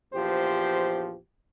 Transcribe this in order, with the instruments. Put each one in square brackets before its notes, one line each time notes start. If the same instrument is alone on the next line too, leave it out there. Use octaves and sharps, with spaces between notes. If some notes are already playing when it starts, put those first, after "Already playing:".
[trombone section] A#1 E2 F3 G4 C5